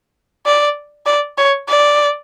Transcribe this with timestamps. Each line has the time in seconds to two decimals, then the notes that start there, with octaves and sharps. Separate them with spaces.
0.46 D5
1.06 D5
1.38 C#5
1.68 D5